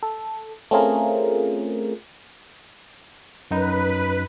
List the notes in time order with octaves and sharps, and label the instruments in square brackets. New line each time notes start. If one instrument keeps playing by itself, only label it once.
[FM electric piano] A4
A3 C4 C#4 F4 G#4 A#4
[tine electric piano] F#2 D#4 [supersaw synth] B4